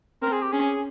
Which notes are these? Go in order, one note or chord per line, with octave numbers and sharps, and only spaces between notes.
C4 A#4
G#4
G4
C#4 G#4